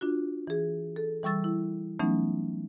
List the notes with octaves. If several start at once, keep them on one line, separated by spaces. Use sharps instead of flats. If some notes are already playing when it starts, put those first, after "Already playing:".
D4 F4 F#4
E3 G#4
A4
E3 G3 C#6 E6 A6
E4
E3 F#3 A3 B3 C#4 D#4